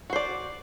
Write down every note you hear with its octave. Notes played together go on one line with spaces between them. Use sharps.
F#4 C5 D5